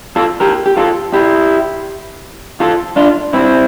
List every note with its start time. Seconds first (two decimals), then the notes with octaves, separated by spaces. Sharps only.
0.16 F4 A4
0.40 G4 A#4
0.66 G4
0.77 F4 A4
1.13 E4 G4
2.60 F4 A4
2.96 D4 F4
3.33 C4 E4